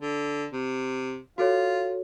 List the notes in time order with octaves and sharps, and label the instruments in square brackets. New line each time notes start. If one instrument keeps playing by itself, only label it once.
[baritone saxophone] D3
C3
[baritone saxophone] F4 [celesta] F#4 A4 C#5